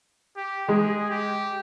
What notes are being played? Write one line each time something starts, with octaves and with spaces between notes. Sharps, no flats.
G4
G#3 G#4
G4